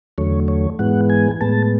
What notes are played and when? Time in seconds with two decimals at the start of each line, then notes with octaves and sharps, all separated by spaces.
0.18 E2 D3 F#3 A3 C#5
0.48 C#5
0.79 G#2 E3 G#3 B3 F#5
1.10 G#5
1.41 A2 G#3 B3 A5